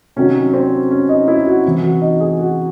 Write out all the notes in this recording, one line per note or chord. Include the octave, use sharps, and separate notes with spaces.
C3 D#3 F#3 C#4
C4
C#4
D#4
E4
F#4
C3 E3
F#4
D#4
G#4
F#4